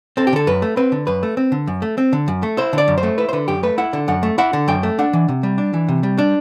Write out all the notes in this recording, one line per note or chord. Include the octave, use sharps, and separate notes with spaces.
C4 A4
G4
D3 A4
F#2 B4
A3
C4 B4
D3
F#2 B4
A3
C4
D3
F#2
A3
C4
D3
F#2
A3
E4 C5
D3 D5
F#2
C5
A3
E4 B4
C5
D3 B4
F#2 G4
A3 B4
E4 F#5
D3
F#2 F#5
A3
E4 F#5
D3
F#2 G5
A3
D4 F#5
E3
C3
G3
D4
E3
C3
G3
D4